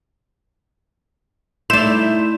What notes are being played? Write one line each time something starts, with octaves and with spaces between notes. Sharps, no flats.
A3 D#4 E4 D5 C6 G6 E7